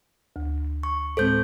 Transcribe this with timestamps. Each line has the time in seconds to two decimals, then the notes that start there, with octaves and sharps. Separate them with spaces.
0.36 D2
0.83 C#6
1.17 A2 G#3 C4 A4 C5 G6